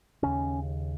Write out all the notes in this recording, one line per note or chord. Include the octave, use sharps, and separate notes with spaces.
D#2 C#3 C#4